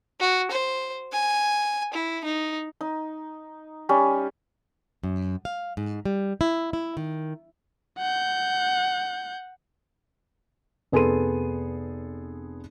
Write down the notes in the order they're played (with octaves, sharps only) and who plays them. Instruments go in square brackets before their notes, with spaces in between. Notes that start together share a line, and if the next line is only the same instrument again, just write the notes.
[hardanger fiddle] F#4
C5
G#5
E4
D#4
[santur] D#4
G3 C#4
[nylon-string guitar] F#2
F5
G#2
G3
E4
E4
D#3
[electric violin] F#5 G6
[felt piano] F1 B3 G#4 A4 C6 D#7